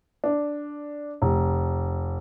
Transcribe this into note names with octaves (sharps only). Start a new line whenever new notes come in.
D4
F1